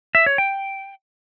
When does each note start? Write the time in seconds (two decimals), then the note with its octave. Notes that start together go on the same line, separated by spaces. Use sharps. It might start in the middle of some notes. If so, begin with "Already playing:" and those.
0.15 E5
0.26 C#5
0.38 G5